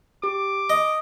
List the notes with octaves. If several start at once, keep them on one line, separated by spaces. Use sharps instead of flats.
G4 D6
D#5 D#6